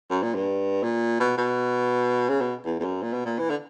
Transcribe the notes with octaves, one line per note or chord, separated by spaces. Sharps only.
F#2
A#2
G2
A#2
B2
B2
C#3
B2
E2
E2
F#2
A#2
B2
A#2
E3
D3